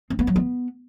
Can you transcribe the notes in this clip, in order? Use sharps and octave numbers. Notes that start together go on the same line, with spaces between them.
C4
B3
F#3
B3